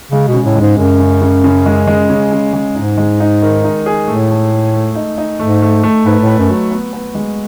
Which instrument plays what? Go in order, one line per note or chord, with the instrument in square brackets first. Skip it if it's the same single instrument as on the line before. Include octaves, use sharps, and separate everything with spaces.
[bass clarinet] C#3 [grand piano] G#3
[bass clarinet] B2
[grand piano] C#3
[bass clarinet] A2
[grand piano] G#3
[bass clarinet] G#2
[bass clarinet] F#2 [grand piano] C#3
[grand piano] C#3
C#3
C#3
G#3
G#3
C#3
C#3
G#3
[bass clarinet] G#2 [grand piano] D#4
[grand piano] G#3
D#4
D#3
D#4
G#4
[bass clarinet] A2 [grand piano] A3
[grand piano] A3
A3
A3
D#4
D#4
[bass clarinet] G#2 [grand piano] A3
[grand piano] A3
A3
[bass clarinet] G#2 [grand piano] B4
[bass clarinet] A2
[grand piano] B4
[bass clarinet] F#2
[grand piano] F#3
B3
B3
G#3